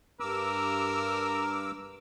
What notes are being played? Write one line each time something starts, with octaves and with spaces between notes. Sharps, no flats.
G2 A#4 D6 E6